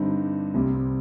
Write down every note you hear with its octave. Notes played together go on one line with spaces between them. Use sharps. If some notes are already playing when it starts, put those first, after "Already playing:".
Already playing: G2 D3 G3 C4 D#4
C2 C3 G3 C4